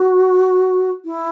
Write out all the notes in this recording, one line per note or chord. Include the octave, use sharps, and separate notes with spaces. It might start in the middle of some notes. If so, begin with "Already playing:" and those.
Already playing: F#4
E4